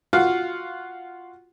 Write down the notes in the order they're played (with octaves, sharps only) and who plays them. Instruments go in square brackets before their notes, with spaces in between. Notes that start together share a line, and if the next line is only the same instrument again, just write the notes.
[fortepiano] F4 F#4 F5 F#5